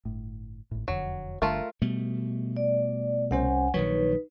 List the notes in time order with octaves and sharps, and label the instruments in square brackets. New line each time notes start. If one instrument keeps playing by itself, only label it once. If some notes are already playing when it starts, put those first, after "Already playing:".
[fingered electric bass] G1 A2
G#1 A2
[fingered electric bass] E1 F2 D3 [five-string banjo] F#3
[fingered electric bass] G1 G2 D3 [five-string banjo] A3 F4 A#4
[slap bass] B2 G3 A3
[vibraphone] D5
[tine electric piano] C2 C#4 C5 [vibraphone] F#5 G#5
[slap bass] A#1 D#3 F#3 [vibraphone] D#4 B4 [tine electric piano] C#5